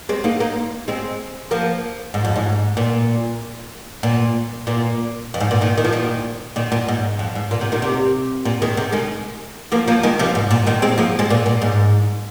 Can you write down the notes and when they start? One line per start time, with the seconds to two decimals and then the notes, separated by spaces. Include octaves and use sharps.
0.09 G#3 C4
0.24 A#3 D#4
0.40 A#3 D#4
0.88 G#3 C4
1.51 F3 A#3
2.14 G#2
2.25 F2
2.36 G#2
2.77 A#2
4.03 A#2
4.67 A#2
5.34 F2
5.40 G#2
5.51 A#2
5.61 A#2 D#3
5.78 D#3
5.84 F3
5.92 A#2 D#3
6.56 A#2 D#3
6.72 A#2
6.88 G#2
7.19 F2
7.35 G#2
7.51 A#2
7.61 C3
7.72 A#2 D#3
7.82 C3
8.45 A#2
8.62 D#3 G#3
8.77 C3
8.92 D#3 G#3
9.72 F3 A#3
9.88 F3 A#3
10.03 D#3 G#3
10.19 C3 F3
10.35 G#2
10.51 A#2
10.67 A#2 D#3
10.82 G#3 C4
10.98 F3 A#3
11.19 G#3 C4
11.30 A#2
11.46 A#2
11.62 G#2